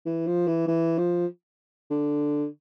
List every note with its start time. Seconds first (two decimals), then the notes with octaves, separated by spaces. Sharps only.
0.06 E3
0.27 F3
0.47 E3
0.68 E3
0.98 F3
1.91 D3